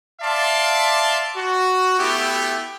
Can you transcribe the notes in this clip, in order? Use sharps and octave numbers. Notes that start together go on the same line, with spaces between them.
D5 E5 F5 A5 C6
F#4
A3 B3 E4 G4